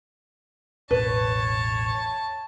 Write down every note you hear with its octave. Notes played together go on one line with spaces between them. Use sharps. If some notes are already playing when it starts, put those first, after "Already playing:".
E1 A1 A2 B4 C#5 A5